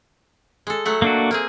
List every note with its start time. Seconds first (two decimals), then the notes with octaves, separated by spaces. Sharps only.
0.67 G#3 A4
0.85 F#3 A3 F#5
1.02 A#3 D4 F#4
1.31 A#3 C4 G#4